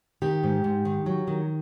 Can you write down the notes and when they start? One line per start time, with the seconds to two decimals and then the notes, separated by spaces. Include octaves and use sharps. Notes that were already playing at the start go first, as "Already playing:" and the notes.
0.22 D#3 G4
0.43 G#2
0.64 G#2
0.85 D#3
1.06 F#3
1.28 D#3